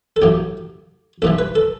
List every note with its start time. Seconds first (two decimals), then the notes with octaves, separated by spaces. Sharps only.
0.16 A4
0.22 A1 A2 F#3 G4
1.22 B1 A2 E3 G3 A4
1.39 B4
1.55 A4